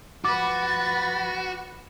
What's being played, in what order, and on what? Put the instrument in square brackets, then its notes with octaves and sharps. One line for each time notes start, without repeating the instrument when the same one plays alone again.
[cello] F3 B4 [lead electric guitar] F#4 [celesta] D6 [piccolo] A6